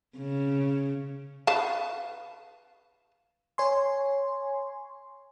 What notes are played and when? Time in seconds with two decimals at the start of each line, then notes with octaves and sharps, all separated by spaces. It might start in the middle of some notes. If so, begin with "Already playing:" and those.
0.17 C#3
1.47 B4 F5 A5
3.58 C#5 G#5 C6